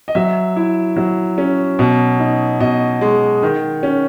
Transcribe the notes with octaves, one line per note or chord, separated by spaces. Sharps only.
D#5
F#3 E5
E4
F#3
C#4
B2
D#4
B2 D#5
G#3
D#3
C#4